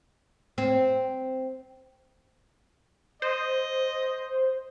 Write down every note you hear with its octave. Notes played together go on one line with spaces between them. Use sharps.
C4
C5 D#5